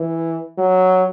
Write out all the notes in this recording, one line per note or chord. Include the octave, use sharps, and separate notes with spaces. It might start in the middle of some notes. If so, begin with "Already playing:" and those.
Already playing: E3
F#3